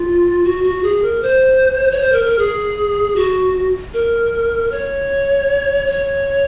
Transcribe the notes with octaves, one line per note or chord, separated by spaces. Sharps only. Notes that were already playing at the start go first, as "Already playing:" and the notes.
Already playing: F4
F#4
F#4
G#4
A#4
C5
C#5
C5
A#4
A#4
G#4
F#4
A#4
C#5
C#5